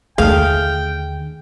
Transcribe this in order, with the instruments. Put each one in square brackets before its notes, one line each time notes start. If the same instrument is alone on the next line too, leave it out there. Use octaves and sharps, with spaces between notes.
[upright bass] D#2 D3 [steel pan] A3 G#4 [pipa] F5 [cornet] G5